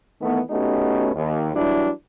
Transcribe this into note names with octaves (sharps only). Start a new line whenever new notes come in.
D#3 E3 A3 B3
A3 B3 C#4 D#4 F#4 G4
D#2
E3 F#3 G3 D4 E4